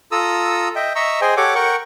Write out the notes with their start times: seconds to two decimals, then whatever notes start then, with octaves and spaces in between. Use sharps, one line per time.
0.12 F4 A4 A#5 D#6 E6
0.76 D#5 E5 G5
0.95 D#5 E5 A#5 C#6 E6
1.21 G#4 C5 D#5 G5 G#5
1.37 G4 A4 C#5 F#5 D6
1.55 A#4 F#5 G5 C#6